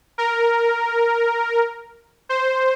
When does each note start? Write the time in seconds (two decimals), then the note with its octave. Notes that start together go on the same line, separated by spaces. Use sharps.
0.18 A#4
2.29 C5